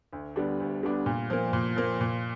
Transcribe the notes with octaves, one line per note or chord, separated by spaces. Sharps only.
D2
D3 G3 B3 D4
D2
D3 G3 B3 D4
A#2
F3 A#3
A#2
F3 A#3
A#2